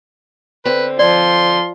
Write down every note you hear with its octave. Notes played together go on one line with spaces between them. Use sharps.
D3 C4 B4
F3 D5 C6